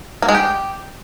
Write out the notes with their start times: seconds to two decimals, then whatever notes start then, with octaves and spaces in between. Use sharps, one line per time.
0.22 A#3
0.28 G#3
0.35 G4